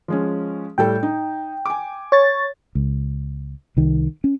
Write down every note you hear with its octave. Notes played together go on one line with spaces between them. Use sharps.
F3 G#3 C#4
A2 G3 A4 G5
D#4
G#5 D6
C#5 A6
C#2
C2 D#3
C#4